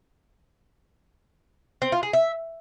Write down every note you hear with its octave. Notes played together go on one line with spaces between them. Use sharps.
C4
F4
G#4
E5